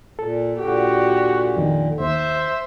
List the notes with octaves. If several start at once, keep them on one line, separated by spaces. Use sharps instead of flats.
A#2 A4
A#2 D3 F#4 G4
F2 D#3
D#2 C5 E5